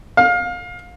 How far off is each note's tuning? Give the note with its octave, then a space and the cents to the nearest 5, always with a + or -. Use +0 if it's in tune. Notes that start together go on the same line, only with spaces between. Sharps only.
F5 +25